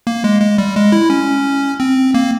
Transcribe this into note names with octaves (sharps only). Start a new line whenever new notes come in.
A#3
G#3
G#3
G3
G#3
E4
C#4
C4
A#3